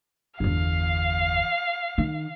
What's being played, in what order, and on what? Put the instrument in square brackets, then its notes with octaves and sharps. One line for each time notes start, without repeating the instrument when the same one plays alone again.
[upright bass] G1 E2 [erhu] F5
[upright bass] D#3